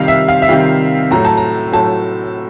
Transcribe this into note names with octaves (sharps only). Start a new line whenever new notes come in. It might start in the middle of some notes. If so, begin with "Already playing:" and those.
Already playing: C3 D#3 G3 F5
E5
F5
E5
C3 D#3 G3 F5
A2 F#3 A3 A#5
A5
A#5
A2 F#3 A3 A5